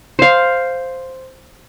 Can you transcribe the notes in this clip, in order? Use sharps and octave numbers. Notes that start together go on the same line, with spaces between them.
C5 F5